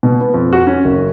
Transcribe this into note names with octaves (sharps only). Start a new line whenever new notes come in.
B2
B3
F2
F#4
C#4
F#1